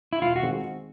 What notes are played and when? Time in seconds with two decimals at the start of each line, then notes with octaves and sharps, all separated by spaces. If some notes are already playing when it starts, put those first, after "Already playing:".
0.13 E4
0.22 E1 F4
0.36 F#4
0.42 D#3 G#3 C4